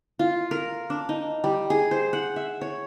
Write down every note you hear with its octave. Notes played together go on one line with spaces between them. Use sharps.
F4
A#4
D4
D#4
G3
G#4
C5
F#5
E5
C#5